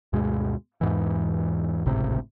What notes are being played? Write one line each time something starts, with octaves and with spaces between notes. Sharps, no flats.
D2 G2 B2 G#3
E2 G#2 E3
G#1 C#2 A2 C3